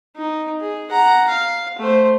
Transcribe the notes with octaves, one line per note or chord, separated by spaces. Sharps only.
D#4
G#4
F#5 A#5
F5
A3 C5